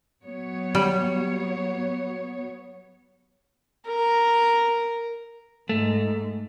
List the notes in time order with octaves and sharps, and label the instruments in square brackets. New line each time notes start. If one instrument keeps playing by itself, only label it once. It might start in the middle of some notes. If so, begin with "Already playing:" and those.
[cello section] F#3 B3 C#5
[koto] G3
[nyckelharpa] A#4
[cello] G#2 [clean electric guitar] A3